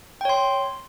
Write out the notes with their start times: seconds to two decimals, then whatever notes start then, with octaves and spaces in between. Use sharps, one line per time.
0.21 G5
0.25 C#5
0.29 C6